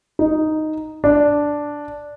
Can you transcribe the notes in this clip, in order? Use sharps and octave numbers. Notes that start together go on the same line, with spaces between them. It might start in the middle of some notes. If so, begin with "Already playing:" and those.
D#4
D4